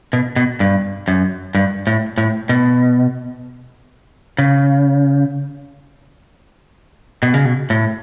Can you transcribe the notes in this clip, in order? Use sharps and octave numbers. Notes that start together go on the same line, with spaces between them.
B2
B2
G2
F#2
G2
A2
A2
B2
C#3
B2
C#3
B2
A2